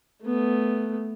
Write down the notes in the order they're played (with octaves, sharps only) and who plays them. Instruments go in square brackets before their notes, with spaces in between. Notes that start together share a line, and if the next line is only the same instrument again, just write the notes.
[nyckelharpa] A3 B3